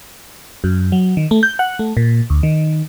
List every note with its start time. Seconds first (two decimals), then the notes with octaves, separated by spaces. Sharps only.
0.64 F#2
0.92 F#3
1.17 D#3
1.31 A3
1.43 G6
1.59 F#5
1.79 A3
1.97 A#2
2.30 D2
2.43 D#3